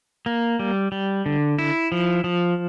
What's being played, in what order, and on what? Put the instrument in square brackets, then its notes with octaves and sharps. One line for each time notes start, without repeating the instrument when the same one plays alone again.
[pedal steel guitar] A#3
G3
G3
D3
E4
F3
F3